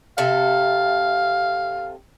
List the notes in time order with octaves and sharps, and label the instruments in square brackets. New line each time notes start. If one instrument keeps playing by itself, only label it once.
[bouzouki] C3 A4 E5 [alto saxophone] F5